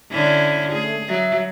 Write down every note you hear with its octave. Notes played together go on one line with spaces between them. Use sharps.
D3 C#4 E4
A3 G#4
F#3 E5